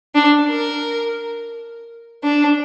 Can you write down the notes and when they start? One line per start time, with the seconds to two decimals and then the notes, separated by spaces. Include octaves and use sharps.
0.15 D4
0.49 A#4
2.23 D4